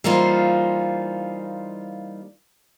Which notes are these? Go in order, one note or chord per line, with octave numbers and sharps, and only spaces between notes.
E3 G3 A#3 D#4 F4 C5